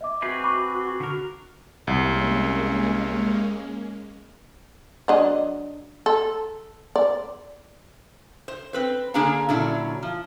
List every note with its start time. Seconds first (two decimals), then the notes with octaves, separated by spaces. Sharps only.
0.01 D#5 E5 D6
0.22 C4 F#4 G#4 B4
0.44 B5 C#6 D6
1.00 D3 F#4 A#4
1.87 C2 G#3 A#3 C#4
5.08 F#3 D4 D#5
6.06 A4
6.96 D5
8.48 C5
8.73 C4 B4 C5
9.14 D3 A#3 D4 G#4 F5 A#5
9.49 A#2 D3 F#3 C#4 D4 E4
10.03 F3